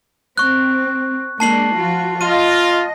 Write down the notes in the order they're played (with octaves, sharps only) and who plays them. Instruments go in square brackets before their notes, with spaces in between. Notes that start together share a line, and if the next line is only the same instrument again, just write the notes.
[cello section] C4 [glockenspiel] C#6 F#6
[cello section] G#3 A#3 D4 [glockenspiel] A5 C7 F#7
[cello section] F3 F4 F#4
[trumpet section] F4 [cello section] D#5 [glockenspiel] D#7